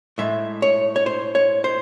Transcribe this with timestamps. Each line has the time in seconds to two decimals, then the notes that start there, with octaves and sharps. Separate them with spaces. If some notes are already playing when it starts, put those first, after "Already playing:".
0.18 A2 G#3 E5
0.62 C#5
0.96 C#5
1.06 C5
1.35 C#5
1.64 C5